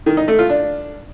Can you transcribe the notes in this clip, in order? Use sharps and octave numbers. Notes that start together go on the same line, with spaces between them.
D#3
D#4
A3
F4
D4